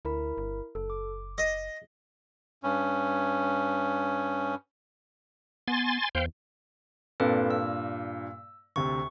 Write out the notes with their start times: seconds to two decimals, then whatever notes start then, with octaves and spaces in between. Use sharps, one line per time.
0.05 D2 E4 A#4 B5
0.37 G1
0.75 F#1 A4
0.90 D6
1.38 D#5
2.63 G2 C#4
5.68 B3 G#5 C6 A6
6.15 E2 C5 F5 G5
7.20 G2 A#2 C4 A4 B4
7.51 E6
8.76 D2 C3 C#6